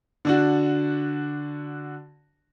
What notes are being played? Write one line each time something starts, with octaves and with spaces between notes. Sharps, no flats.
D3 D4 F#4